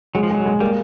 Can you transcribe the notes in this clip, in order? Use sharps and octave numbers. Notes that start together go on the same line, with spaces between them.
F#3 G#3
F3
F#3 G#3
G#3
G3 A#3